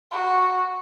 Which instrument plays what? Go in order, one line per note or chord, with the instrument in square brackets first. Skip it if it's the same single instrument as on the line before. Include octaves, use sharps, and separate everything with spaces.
[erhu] F#4